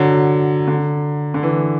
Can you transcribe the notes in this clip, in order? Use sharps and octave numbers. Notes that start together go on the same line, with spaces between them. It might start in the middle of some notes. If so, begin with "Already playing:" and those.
Already playing: D3 F#3
D3
D3
E3